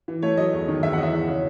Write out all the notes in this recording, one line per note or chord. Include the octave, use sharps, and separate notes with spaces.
E3
A3 C#5
F#3 D#5
E2
D#3
E2 E5
F#5
E3 D#5
E5
E2
C#3